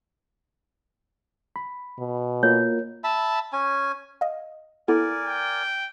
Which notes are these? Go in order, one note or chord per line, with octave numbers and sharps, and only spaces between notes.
B5
B2
A#3 F4 A#4 C#5
E5 A5 B5
C#4 G#5
D#5 F5
B3 E4 A4 A#4 D5 G#5
G5